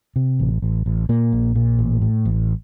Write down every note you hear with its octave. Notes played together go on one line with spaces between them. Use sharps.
C3
A1
A1
A1
A#2 A#3
A#1
A#2
A1
A2
A1